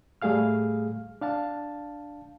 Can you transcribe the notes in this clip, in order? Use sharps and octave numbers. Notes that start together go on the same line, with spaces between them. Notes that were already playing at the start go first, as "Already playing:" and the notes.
A2 G3 A3 G#4 F5 F6
D4 F5 A5